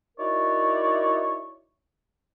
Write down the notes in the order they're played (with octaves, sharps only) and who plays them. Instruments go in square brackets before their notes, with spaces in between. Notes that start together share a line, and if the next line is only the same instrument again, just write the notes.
[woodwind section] D#4 E4 F#4 A#4 C#5 D5